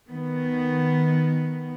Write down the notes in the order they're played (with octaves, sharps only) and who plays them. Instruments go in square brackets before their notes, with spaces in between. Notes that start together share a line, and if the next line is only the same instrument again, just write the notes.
[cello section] D#3 B3